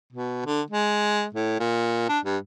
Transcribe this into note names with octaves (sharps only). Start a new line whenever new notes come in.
B2
D3
G#3
A2
A#2
D4
G2